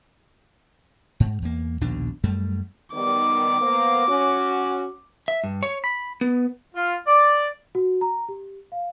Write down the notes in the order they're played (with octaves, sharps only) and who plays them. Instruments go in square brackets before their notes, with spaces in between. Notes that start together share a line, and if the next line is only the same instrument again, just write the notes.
[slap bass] G#2
E2 A#3
A#1 D#2 B2 D4
F#2 G3 A3
[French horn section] D#3 G3 B3 [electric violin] D6
[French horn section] A#3 B3 C5
C#4 F#4
[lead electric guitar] E5
G2
C#5
B5
B3
[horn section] F4
D5
[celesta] F#4
A#5
G4
F5